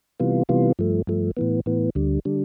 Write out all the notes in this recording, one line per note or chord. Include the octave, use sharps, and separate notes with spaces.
C3 E3 G3 B3 F4
C3 E3 G3 B3 F4
G2 F3 A3
G2 F3 A3
A2 E3 B3
A2 E3 B3
D2 D3 G3
D3 G3